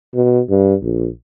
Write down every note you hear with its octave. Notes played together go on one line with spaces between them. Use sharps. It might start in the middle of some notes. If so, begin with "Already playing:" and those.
B2
G2
A#1